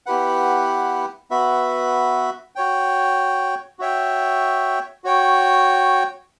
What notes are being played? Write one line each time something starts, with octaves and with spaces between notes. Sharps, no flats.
B3 E4 G4 B4 F#5
B3 F#4 B4 E5
F#4 C#5 G5
F#4 C#5 E5 G5
F#4 C#5 G5